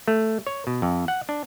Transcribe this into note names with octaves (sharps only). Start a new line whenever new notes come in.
A3
C#5
B2
F2
F#5
D4